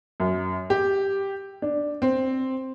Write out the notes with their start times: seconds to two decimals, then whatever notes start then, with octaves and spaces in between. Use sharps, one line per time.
0.20 F#2
0.70 G4
1.62 D4
2.02 C4